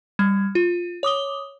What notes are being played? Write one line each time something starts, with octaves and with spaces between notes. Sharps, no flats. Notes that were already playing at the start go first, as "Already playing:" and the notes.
G3 G#6
F4
C#5 D6 D#6 G7